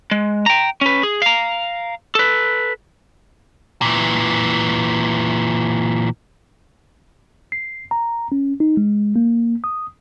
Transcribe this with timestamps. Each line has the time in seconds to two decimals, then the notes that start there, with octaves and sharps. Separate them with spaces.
0.11 G#3
0.46 G5 A#5
0.81 C#4 B4
1.03 G#4
1.22 F5 A#5
2.15 A4 B4
3.81 A#2 E3
7.52 C7
7.91 A#5
8.32 C#4
8.60 D#4
8.77 G#3
9.16 A#3
9.64 D#6